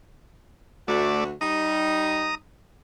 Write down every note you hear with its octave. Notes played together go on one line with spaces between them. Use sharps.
D2 A3 F#4 D5
G3 D#4 A#5 D#6